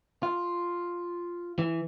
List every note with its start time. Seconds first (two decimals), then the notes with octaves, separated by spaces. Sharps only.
0.23 F4
1.59 E3